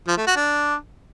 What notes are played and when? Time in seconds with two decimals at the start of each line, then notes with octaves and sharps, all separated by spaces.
0.08 F3
0.17 A3
0.27 F#4
0.36 D4